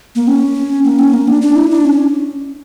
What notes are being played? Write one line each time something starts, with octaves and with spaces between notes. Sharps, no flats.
A#3
C#4
A#3
C#4
A#3
D4
D4
E4
D4
C#4